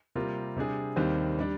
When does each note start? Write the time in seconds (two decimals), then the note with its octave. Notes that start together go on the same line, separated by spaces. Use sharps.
0.15 C3 G3 A#3 F4 A#4
0.57 C3 G3 D4 G#4
0.96 D#2 D#3 G3 C4
1.39 G3 D4